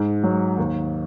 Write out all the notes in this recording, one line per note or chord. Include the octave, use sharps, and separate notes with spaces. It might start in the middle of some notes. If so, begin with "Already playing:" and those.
Already playing: G#2
F#3
D#2